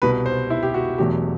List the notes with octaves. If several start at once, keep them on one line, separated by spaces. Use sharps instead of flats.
C2 B2 G3 B4
C5
E4
G4
F#4
E1 E2 B2 F#3 A3 G4